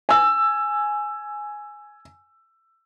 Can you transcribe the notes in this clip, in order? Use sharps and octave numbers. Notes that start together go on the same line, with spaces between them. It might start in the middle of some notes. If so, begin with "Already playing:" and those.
G#5 E6